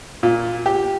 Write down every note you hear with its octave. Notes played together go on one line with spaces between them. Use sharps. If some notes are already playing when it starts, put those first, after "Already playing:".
A#2
G4